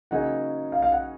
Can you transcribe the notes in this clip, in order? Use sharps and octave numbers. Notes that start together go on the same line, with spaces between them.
C#3 F#3 A#3 D#4 G#4 F#5
F5
F5
F#5